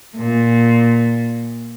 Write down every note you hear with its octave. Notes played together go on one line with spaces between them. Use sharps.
A#2